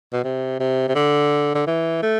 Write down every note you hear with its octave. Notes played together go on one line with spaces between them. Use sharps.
B2
C3
C3
C3
D3
D3
E3
A3